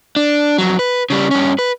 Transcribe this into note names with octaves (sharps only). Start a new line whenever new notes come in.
D4
F2 F#3
B4
C#3 G3
G2 C#4
B4